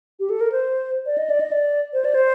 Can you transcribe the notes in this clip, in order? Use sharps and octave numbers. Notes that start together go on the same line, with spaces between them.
G4
A4
A#4
C5
D5
D#5
D5
D#5
D5
C5
D5
C5